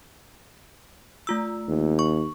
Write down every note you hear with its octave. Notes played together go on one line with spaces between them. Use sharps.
A3 F4 E6
D#2
C#6